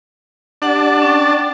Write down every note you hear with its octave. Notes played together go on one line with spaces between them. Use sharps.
D4 G4 F#5 A5
C#4 G5